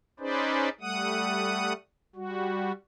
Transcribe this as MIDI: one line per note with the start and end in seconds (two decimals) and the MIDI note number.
0.20 0.69 61
0.20 0.69 63
0.20 0.69 68
0.20 0.69 71
0.20 0.69 72
0.20 0.69 74
0.81 1.73 55
0.81 1.73 57
0.81 1.73 78
0.81 1.73 87
2.16 2.72 55
2.16 2.72 66